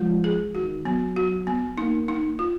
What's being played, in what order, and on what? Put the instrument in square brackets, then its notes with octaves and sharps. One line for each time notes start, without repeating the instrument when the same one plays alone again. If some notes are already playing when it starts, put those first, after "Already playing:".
Already playing: [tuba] F3 [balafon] G#3
[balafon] G#4
[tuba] D#3 [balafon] F#4
[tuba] F#3 [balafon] B3
[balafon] F#4
B3
[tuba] A#3 [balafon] D#4
[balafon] D#4
F4